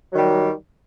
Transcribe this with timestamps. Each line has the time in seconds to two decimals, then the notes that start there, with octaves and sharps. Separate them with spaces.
0.10 F#3
0.14 D#3
0.17 G3